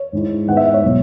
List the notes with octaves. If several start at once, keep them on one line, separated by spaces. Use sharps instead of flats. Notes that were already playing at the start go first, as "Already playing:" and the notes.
Already playing: C#5
G#2 G#3 E4
G#2 G#3 B3 F#5
E5
C#5
B2 F#3